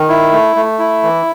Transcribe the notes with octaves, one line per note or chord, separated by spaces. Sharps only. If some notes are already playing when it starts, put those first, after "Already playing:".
Already playing: D#3
E4
A3
A3
E4
E3